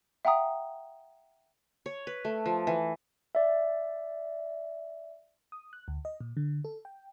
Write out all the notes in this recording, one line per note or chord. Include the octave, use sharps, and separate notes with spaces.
E5 F#5 G5 A#5 D#6
C#5
B4
A3
F3
E3
D5 E5
D#6
F#6
D2
D#5
A#2
D3
A4
G5